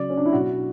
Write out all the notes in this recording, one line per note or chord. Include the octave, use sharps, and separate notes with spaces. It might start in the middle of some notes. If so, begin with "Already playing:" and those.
Already playing: C#3 F#3 D5
C#4
D4
E4
B2 F#3 F#4